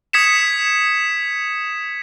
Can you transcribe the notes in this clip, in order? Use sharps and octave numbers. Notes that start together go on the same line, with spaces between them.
D#6 G#6 B6 C#7 E7